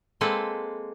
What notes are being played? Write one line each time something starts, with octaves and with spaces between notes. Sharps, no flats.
G#3 A#3 C4 A4 B4